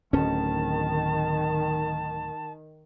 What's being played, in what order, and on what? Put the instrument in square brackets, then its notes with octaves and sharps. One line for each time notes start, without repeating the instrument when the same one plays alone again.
[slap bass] D1 D2 C#4 [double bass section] D#3 [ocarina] A5